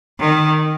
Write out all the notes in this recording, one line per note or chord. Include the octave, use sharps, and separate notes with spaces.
D#3